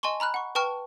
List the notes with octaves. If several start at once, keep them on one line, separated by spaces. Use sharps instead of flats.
D#5 G#5 A5 C6 C#6
A#5 B5 F6 F#6
F#5 C#6
B4 G5 A5 C#6 F6